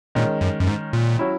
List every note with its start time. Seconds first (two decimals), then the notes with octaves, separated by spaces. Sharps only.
0.15 A#2 D#3 G#3 C#4
0.41 F#2
0.60 F#2
0.67 G#2
0.93 A#2
1.19 F#3 C#4 E4